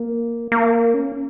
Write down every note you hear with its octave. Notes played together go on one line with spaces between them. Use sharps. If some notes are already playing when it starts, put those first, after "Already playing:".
Already playing: A#3
A#3
C#4